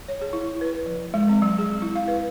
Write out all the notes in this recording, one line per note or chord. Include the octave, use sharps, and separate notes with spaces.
C#5
G#4
E4
B4
F3
G#3
C4
F#3
G#4
E4
F5
B4